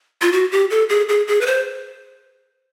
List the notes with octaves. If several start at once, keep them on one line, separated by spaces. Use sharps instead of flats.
F4
F#4
G4
A4
G#4
G#4
G#4
B4
C5